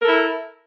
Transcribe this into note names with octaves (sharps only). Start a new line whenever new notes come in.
E4 A4 A#4